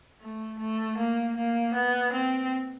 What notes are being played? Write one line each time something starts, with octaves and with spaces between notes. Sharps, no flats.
A3
A3
A#3
A#3
B3
C4